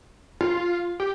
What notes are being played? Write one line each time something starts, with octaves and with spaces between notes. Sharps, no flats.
F4
G4